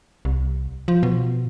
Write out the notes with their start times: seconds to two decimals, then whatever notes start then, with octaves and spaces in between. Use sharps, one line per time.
0.25 C2
0.88 F3
1.03 B2